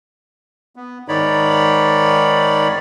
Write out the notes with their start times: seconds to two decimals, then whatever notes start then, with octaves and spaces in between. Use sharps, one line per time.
0.76 B3
1.08 G#2 D#3 D#4 C#5 D5 B5